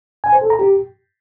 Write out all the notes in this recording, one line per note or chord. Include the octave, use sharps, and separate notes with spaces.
G#5
C5
A4
A#5
G4